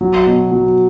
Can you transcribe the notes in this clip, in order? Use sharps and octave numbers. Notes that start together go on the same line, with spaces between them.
F#3
B2
F#3